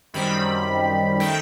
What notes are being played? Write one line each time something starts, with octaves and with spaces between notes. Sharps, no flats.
F#2 D#3 G3 C4 B5
D#3 A3 G5